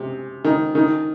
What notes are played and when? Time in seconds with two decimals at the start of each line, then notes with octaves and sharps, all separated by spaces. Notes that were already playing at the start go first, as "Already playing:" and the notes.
Already playing: C3
0.45 D#3
0.75 D#3